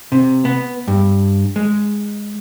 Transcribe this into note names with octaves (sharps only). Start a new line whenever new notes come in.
C3
B3
G2
G#3